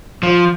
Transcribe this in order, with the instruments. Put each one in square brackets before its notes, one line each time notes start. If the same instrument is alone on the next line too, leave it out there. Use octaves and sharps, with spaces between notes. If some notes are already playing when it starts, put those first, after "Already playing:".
[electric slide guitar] F3